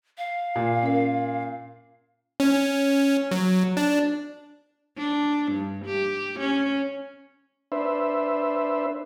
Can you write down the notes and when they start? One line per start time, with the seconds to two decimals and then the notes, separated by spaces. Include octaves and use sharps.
0.18 F5
0.56 A#2
0.83 C#4 A#4
2.40 C#4
3.31 F#3
3.77 D4
4.97 D4
5.52 G2
5.85 G4
6.39 C#4
7.72 D4 B4 C5 E5